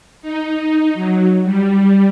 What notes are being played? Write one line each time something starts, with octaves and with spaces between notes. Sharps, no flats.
D#4
F#3
G3